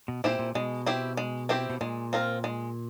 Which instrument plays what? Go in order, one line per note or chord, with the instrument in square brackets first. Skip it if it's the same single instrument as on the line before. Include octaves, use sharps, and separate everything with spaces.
[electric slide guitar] B2
[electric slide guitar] A#2 [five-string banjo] C4 E4 G4 C5
[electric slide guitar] A#2
[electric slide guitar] B2 [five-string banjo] G#3
[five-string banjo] C4 E4 G4 C5
G#3
C4 E4 G4 C5
[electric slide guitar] B2
[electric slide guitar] A#2 [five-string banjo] G#3
[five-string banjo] C4 F4 A#4
G#3